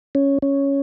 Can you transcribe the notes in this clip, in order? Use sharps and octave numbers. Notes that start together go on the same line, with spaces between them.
C#4
C#4